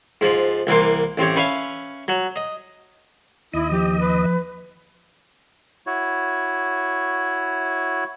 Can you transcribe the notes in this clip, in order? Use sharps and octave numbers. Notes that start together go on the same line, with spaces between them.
G#2 F3
C2 E3 A#3 C6
A1 C4 G4 C#5
C#4 B4 E5 F5
F#3
D#5
D#2 E4 D#5
F3 G4
B4
E4 F#4 C#5